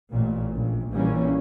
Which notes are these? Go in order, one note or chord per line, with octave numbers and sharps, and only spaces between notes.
A1 A#2
A#1
A#1 E3 G3 A#3 C#4